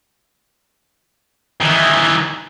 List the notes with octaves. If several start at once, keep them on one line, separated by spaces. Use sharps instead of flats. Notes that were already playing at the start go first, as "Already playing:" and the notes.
D#3 E3